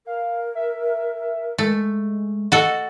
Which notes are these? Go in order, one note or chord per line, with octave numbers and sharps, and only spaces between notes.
A#4 F5
E5
G#3 A3
F#4 A4 D#5